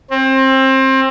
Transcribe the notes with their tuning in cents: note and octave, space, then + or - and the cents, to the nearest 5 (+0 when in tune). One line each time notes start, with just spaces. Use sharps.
C4 +25